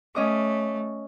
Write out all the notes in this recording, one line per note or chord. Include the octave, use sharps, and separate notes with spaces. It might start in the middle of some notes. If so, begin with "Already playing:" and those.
A3 C#4 D#5 D6